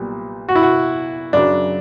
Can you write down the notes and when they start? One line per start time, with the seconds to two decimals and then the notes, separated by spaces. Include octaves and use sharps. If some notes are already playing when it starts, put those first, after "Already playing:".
Already playing: B1 A#2 G3
0.49 F#4
0.55 E4
0.62 F#4
1.33 F#2 C#3 F#3 D4